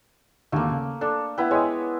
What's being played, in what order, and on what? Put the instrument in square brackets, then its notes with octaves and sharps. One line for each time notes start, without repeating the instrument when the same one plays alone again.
[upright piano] G#1 D#2 D3 [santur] A3 A#3
[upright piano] C#3
[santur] D4 [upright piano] A4
[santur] B3 E4 B4 [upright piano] G5
[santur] G#3 [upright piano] C#5 G5 D#6